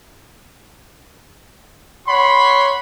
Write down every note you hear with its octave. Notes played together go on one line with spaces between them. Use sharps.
C#5 F#5 B5 C6